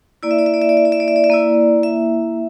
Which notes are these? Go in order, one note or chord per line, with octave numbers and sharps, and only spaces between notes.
A#3 E4 D5
E5
D5
E5
D5
E5
D5
E5
D5
E5
D5
E5
D5
E5
A#3 E4 D5
E5